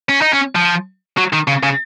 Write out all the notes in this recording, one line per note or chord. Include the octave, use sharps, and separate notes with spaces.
C#4
D#4
C#4
F3
F#3
D#3
C#3
C#3